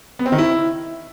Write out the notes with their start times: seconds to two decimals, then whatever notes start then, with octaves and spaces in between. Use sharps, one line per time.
0.19 B3
0.26 C4
0.32 D#3
0.38 E4